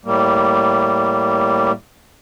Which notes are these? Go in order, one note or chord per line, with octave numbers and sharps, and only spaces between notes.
A2 G3 A#3